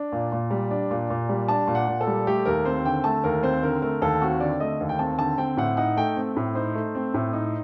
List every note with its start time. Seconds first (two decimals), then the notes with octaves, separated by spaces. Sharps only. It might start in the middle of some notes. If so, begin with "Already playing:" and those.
Already playing: D4
0.12 A#2
0.32 A#2
0.51 G3
0.71 D4
0.91 A#2
1.10 A#2
1.29 G3
1.48 D4 A5
1.67 A#2
1.75 F#5
1.87 A#2
2.01 A4
2.07 G3
2.27 A3 G4
2.45 D#2 A#4
2.65 C4 C5
2.84 D3 G5
3.04 A3 A5
3.24 D#2 A#4
3.43 C4 C5
3.63 D3 A#4
3.82 A3 A#4
4.02 D#2 A4
4.21 C4 F#4
4.40 D3 D5
4.60 A3 D#5
4.81 D#2
4.89 G5
4.99 C4 A5
5.18 D3 A5
5.38 C4 G5
5.57 A2 F#5
5.77 D#4 F#5
5.96 A3 G5
6.16 C4
6.36 A2
6.55 D#4 C5
6.74 A3
6.95 C4
7.14 A2
7.33 D#4